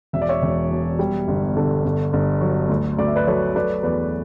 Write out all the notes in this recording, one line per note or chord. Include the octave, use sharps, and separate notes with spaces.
E1 E5
D5
C#5 E5
E1
B2
G3
G1
D3
G1
G1
F#3
D2
D2 D5
E5
B4 D5
F#3 A4 C#5
A3 B4 D5
E2 B4 D5